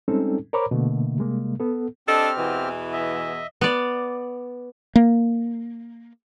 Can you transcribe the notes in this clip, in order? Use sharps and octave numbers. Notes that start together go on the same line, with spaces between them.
G3 G#3 C4 C#4 D#4 A4
A#4 C5 C#5 A#5 B5 D6
B2 D3 A3 A#3
C3 G3 G#3 A#3
B3 A4
C4 D4 G4 A4 D#5 F6
E2 B2 E3
D#5 E5
B3 D5
A#3